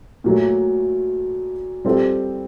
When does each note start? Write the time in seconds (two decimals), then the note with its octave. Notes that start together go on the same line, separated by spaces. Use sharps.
0.24 A#2 F#3 A3
1.85 G3 C4 F4 A4